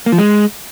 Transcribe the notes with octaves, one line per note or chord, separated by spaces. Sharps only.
A#3
F3
G#3